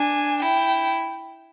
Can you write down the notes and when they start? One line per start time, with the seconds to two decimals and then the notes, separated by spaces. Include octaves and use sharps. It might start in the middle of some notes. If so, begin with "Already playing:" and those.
Already playing: D4 G#5
0.43 E4 G5